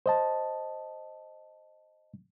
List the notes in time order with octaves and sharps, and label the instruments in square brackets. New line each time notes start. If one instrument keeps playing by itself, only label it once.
[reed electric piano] C5 D#5 A5